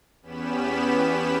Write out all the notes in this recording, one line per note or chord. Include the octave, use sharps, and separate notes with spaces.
E2 B3 C#4 G4 B5 E7